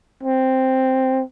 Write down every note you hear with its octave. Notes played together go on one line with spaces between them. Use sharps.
C4